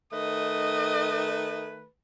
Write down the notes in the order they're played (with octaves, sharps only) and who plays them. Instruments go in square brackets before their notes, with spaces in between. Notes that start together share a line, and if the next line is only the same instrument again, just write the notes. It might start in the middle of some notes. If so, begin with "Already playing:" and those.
[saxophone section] D#3 A3 B4 [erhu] D#5